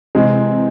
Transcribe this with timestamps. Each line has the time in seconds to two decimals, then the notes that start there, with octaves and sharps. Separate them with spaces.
0.15 C3 E3 G#3 C4